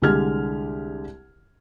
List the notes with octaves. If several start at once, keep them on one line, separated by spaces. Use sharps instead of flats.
C2 D3 G#3 G4 F6 G#6